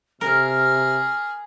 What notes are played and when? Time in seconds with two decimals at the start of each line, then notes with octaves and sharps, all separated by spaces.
0.21 C3 G#4 A#4 F6